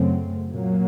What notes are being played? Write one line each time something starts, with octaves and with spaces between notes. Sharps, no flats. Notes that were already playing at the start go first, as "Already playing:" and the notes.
Already playing: F#2 C#3 F#3 A3 C4
A#2 F#3 A#3